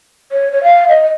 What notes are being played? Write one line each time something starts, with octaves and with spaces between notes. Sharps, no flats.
C#5
C#5
F5
D#5